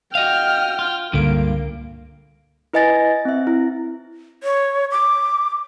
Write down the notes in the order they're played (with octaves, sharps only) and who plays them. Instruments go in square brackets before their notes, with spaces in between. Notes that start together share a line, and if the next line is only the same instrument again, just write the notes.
[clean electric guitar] F#4 D#5 F5 [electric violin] G5 F6
[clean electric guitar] F4
[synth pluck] C#2 D3 D7 [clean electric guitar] G2 A#2 [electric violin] A#3
[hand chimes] E4 B4 D#5 G#5 A6 A#6
C4 E5
E4
[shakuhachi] C#5
D6